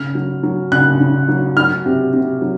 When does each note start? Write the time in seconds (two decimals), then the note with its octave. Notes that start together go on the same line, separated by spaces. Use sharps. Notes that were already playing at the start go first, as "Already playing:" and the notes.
Already playing: C#3 F6
0.15 F#3
0.43 F#3
0.72 C#3 F#6
1.00 C#3
1.28 F#3
1.57 F#3 F6
1.86 C3
2.13 C3
2.42 F#3